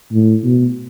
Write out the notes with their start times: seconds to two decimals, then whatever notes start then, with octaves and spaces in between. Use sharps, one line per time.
0.13 A2
0.44 B2